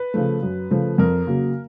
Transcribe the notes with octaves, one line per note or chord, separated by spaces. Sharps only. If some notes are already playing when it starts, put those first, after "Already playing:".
Already playing: B4
C#3 F3 A3
F#2
C#3 F3 A3
F2 A#4
C#3 F#3 A#3